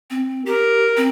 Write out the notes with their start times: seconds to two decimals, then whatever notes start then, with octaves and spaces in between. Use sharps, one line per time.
0.10 C4
0.46 G4 A#4
0.97 C4